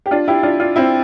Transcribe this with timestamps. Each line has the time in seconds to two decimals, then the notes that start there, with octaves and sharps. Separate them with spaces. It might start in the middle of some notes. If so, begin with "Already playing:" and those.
0.06 G4
0.11 D4 F4
0.28 E4 G4
0.43 D4 F4
0.60 D4 F4
0.76 C4 E4